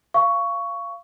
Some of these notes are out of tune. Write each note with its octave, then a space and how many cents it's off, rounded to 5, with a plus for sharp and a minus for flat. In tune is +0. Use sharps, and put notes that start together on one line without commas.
F5 -20 C#6 +10